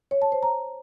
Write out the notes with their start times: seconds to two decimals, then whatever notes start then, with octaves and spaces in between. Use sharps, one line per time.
0.11 C#5
0.22 A5
0.32 C5
0.43 A#5